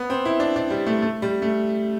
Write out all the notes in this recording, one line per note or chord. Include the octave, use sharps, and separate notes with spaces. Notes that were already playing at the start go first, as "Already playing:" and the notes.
Already playing: B3
C4
E4
D4
D4
G3
A3
A3
G3
A3